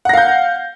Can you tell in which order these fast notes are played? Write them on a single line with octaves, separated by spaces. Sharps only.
F#5 A#6 F5 G6